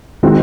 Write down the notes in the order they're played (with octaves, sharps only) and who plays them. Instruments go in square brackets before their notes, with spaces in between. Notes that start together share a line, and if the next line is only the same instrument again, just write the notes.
[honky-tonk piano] D#3 G#3 C4 F#4